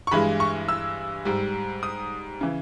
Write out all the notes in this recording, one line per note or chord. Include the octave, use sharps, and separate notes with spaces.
C#6
G2 E3 G#3 B5
C#6
E6
G#2 G3
D#6
C#3 E3